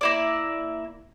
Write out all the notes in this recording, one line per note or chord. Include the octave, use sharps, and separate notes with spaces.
A#3 E4 D5